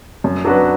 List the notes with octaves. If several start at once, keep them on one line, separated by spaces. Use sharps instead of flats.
F#2
F#3 D4 F#4 B4